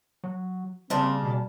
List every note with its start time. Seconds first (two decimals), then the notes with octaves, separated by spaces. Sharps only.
0.24 F#3
0.90 C#3 G3 A#3 C4 D4
1.20 B2